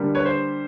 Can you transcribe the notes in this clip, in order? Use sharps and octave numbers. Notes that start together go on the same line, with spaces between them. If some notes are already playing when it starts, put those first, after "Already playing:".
Already playing: D3 G3 A#3
B4 C#5
C5